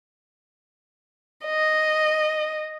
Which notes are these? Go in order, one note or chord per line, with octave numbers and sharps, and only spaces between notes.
D#5